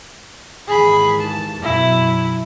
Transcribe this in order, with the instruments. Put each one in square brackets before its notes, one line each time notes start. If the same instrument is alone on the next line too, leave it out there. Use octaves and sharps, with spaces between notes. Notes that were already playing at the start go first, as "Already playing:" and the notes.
[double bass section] D#2 G#2 E3 [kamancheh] G#4 B5
[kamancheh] A5
[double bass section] F#2 B2 F#3 [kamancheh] E4